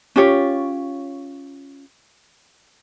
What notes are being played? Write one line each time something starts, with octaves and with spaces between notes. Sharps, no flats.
C#4 F4 G4 C#5